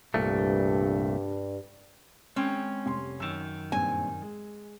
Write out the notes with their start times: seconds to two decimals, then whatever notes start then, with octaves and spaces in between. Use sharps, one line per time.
0.14 C2 G2 A#2 A3
2.36 G#3 C4 C#4 G5
2.86 F1 G3 C6
3.20 F#2 D#3 E6 E7
3.72 G2 A#2 C4 G#5
4.22 G#3